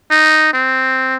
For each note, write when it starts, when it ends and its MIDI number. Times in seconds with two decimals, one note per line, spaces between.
0.11 0.53 63
0.54 1.17 60